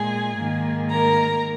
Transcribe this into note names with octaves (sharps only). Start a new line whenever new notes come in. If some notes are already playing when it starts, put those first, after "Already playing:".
Already playing: A#2 G#3 G#4 G#5
G#2 D#3 A#3
A#4 A#5